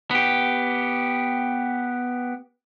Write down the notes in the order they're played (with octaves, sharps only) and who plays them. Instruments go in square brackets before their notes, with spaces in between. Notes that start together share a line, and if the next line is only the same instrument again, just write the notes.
[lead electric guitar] B3 G4